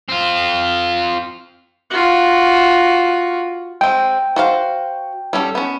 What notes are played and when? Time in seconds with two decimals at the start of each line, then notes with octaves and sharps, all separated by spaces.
0.09 C4 F4
1.90 F4 F#4
3.81 G#3 C4 G5
4.36 F#4 C5 F5
5.33 G3 C#4 A4
5.55 B3 C#4